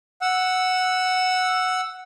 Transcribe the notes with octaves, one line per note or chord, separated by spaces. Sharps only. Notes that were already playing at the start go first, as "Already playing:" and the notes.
F#5 E6